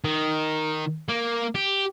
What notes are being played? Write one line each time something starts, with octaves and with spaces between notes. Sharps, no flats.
D#3
A#3
G4